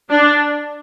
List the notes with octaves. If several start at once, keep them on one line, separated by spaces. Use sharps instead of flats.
D4